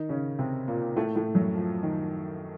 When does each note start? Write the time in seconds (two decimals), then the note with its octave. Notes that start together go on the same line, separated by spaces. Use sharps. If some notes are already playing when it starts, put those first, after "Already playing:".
Already playing: D#3 D#4
0.09 C#3 C#4
0.39 C3 C4
0.68 A#2 A#3
0.96 A2 A3
1.16 A2 A3
1.35 F#2 F#3
1.54 F3
1.83 D#3